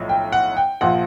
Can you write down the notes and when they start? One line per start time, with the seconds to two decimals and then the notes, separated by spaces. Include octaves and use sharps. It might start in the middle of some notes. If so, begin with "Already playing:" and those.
Already playing: B1 A2 F3
0.09 G5
0.32 F#5
0.57 G5
0.81 A#1 A#2 F3 F#5